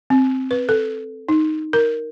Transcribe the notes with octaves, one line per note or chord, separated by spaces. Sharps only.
C4
B4
A4
D#4
A#4